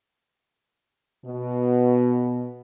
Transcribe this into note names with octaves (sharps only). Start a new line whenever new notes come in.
B2